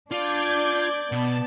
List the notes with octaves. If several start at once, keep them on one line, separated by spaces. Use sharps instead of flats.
D4 F4 D5 F5 D6 G6 G#6
B2 B3 A5